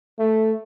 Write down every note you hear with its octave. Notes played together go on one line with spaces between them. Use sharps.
A3